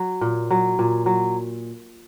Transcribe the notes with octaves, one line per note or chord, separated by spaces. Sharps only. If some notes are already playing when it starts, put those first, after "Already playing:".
Already playing: F#3
A#2
F#3
A#2
F#3